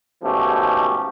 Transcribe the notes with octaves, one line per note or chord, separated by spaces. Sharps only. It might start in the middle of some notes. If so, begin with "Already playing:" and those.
G#2 B2 F3 A3 C#4 G4